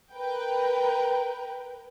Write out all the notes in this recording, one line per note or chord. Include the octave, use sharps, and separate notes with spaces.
A#4 B4 G5